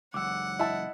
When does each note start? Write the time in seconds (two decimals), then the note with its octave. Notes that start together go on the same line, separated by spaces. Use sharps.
0.14 C#2 F#2 F#5 D6 E6
0.59 E4 D#5 A5